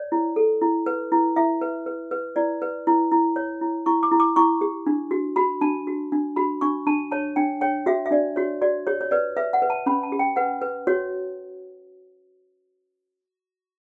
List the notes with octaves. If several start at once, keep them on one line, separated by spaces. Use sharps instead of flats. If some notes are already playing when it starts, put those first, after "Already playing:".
Already playing: C#5 D5
E4
A4
E4
B4
E4
E4 E5
B4
B4
B4
E4 D5
B4
E4
E4
C#5
E4
E4 C#6
D6
E4
D6
E4 C#6
G4
D4
F#4
F#4 B5
D4 A5
F#4
D4
F#4 B5
D4 C#6
D4 A5
C#5 A5
D4 G5
C#5 G5
F#4 E5
E5
D4 D5
F#4 C#5
F#4 D5
G4 C#5
C#5
B4 D5
B4 E5
F#5
B4
A5
C#4 B5
A5
G4
G5
B4 F#5
B4
F#4 C#5